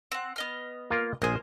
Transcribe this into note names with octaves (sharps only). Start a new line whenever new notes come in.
C4 F#5
B3 D#5 F6
A#3 F4 A#4
A#1 G#4 A#4 C5